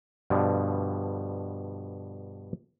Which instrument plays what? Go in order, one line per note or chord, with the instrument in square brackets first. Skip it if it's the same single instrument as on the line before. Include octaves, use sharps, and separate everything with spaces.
[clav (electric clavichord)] G2 B2 D3 F3